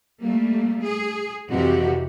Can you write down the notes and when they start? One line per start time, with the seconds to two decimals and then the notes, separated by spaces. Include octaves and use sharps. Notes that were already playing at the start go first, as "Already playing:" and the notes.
0.21 G3 A3 A#3
0.84 G#4
1.50 F2 C3 E3 F#4 G4